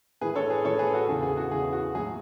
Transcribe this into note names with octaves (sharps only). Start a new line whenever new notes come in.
A2 E3 G#4 B4
A4 C#5
G#4 B4
A2 E3 A4 C#5
G#4 B4
F#4 A4
E2 C#3 E3 G#4
G#4
F#4
E2 C#3 E3 G#4
F#4
A2 F#3 G#4